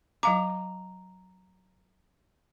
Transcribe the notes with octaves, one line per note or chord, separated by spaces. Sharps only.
F#3 F5 A#5 D6